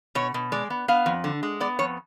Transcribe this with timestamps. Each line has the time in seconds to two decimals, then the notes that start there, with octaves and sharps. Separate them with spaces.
0.15 B2 C#5
0.34 B2
0.52 G#3 D5
0.70 B3
0.88 B3 F5
1.06 F2
1.24 D3
1.43 G#3
1.60 B3 D5
1.79 F2 C#5